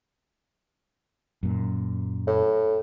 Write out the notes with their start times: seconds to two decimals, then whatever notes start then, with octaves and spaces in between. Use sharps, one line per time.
1.43 F#2 A#2
2.27 A2